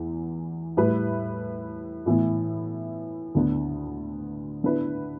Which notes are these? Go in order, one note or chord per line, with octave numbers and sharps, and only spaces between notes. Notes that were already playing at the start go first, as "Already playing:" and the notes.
Already playing: E2 E3
A2 G3 E4 B4
A2 E3 B3 E4
D2 D3 B3
D3 B3 E4 B4